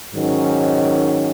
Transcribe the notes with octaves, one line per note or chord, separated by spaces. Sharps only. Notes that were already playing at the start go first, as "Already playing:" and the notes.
G#2 D#3 F#3 C#4